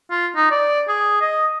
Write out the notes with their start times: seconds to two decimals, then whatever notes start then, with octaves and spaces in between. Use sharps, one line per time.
0.11 F4
0.36 D#4
0.51 D5
0.88 G#4
1.21 D#5